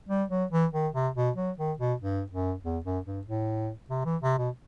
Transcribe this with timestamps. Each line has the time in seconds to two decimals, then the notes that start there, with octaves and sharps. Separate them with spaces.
0.09 G3
0.30 F#3
0.51 E3
0.73 D#3
0.93 C3
1.15 B2
1.36 F#3
1.58 D#3
1.79 B2
2.00 G2
2.31 F#2
2.63 E2
2.84 F#2
3.06 G2
3.27 A2
3.90 C3
4.05 E3
4.22 C3
4.38 B2